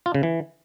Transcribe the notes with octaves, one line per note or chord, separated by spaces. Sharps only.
F4
C#3
E3